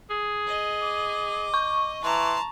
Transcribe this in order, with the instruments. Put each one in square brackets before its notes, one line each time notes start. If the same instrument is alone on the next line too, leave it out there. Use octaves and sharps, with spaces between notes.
[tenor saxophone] G#4
[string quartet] D#5
[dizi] D6
[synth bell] C#6
[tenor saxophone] E3 [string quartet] A5 A#5 [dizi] C6